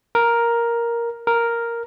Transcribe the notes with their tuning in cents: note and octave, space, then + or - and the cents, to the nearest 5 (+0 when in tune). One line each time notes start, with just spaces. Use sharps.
A#4 +5
A#4 +0